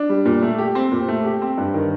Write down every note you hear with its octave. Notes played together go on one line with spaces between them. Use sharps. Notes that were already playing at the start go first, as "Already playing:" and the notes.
Already playing: D4
G3
A#2
A3
G4
C4
A#2
A3
G4
C4
G2
D#3